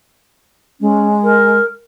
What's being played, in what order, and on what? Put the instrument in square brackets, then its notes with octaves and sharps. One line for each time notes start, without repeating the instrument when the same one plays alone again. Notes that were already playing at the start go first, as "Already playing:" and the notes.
[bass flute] G#3 [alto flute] C#4
[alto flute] A#4